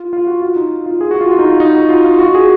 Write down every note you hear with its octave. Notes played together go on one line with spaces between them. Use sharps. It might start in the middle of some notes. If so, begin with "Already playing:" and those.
Already playing: F4
F4
F#4
F4
D#4
F4
G#4
F#4
F4
F4
D#4
F4
D#4
F#4
F4
F4
F#4
G#4